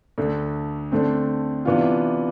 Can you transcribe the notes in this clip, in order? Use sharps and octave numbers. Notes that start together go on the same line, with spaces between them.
D2 D3 A3
D3 A3 C4
C3 E3 B3 D4 F4